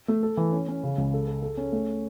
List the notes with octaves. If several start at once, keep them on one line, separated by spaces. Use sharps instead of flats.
A3
A4
E3
C#4
C#4
C#3
C#2
A4
A4
A4
C#4
A3